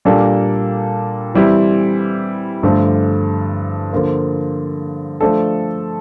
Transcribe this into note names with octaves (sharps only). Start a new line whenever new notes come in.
A#2 G3 A#3 D4 A4
E3 G3 C4 E4
G2 D3 F3 A3 D4
D3 F3 A#3 F4 A#4
F3 A3 D4 A4